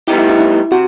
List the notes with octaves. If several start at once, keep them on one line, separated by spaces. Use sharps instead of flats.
A2 G3 B3 D#4 E4 G4
E4
E4
E4
C3 F#4